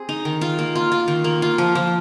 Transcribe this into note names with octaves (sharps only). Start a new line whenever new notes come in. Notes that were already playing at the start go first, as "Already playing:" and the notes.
Already playing: C4 G#4
D#4
D#3
F4
A#3
F4
F4
D#3
A#3
F4
F3
F3